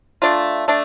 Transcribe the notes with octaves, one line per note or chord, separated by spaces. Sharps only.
A3 D4 F4
A3 D4